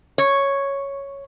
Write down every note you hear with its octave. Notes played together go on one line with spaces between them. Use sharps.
C#5